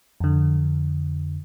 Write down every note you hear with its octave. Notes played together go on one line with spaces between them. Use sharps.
F2 D3